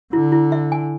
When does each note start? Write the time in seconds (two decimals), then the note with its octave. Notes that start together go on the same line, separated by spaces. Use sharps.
0.13 D3 E4
0.32 E4
0.52 E5
0.72 G#5